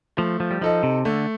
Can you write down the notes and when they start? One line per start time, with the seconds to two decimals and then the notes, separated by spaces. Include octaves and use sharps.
0.17 F3 A3
0.40 F3
0.51 G3
0.61 F3 D#4 A4 D#5
0.83 C3
1.05 D3 A3